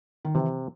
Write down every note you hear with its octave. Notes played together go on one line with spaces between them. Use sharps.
D#3
C3 E3